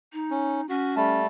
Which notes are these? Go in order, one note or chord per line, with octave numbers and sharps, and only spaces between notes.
D#4
C#4
C#4 F#4
G3 A3 A5